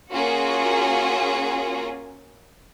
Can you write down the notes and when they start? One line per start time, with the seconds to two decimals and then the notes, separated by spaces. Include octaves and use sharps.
0.11 A#3 C#4 F4 F#4 G#4